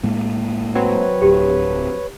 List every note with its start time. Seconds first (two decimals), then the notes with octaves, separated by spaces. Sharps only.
0.03 A2 G#3 A#3
0.75 F#3 C4 B4 C#5
1.22 D1 G4